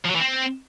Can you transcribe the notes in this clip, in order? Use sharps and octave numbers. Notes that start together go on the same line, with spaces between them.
F3
F#3
E3
C4